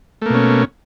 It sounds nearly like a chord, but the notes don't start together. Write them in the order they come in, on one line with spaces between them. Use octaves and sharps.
A3 A#3 B2 C#4